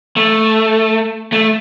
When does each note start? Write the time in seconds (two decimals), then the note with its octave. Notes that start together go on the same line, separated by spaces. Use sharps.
0.17 A3
1.32 A3